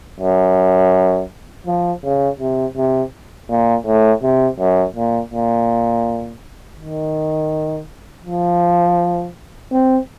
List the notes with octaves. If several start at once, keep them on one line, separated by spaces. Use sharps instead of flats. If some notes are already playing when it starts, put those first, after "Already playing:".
F#2
F3
C#3
C3
C3
A#2
A2
C3
F#2
A#2
A#2
D#3
F3
C4